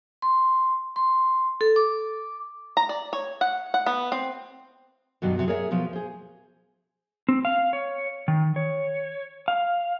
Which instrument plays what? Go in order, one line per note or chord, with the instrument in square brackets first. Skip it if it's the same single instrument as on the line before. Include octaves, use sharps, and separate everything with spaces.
[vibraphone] C6
C6
A4
D6
[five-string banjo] A#5
D5
C#5
F#5
F#5
B3
C4
[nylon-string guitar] G2 B2 D#3 F#3
C3 F#3 B3
G#4 A#4 C#5 D5 E5 F#5
B2 F3 F#3 B3
G#4 C5
[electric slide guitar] C4
F5
C#5
D#3
C#5
F5